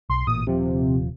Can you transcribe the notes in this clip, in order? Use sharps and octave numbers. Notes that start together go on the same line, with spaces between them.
B1 C6
A1 A#2 D#6
D#1 C3 F3